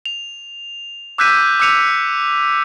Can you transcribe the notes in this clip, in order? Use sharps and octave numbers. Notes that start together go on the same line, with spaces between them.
F7
D6 E6 F#6 G6 B6 D#7
D6 E6 F#6 C#7 D#7 F7